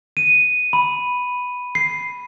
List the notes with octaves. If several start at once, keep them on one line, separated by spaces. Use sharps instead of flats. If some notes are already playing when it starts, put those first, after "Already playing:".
D#7
B5
C7